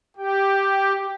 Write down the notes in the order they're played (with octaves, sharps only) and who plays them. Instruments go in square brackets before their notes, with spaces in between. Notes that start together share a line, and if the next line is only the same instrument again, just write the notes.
[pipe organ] G4 [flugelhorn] G5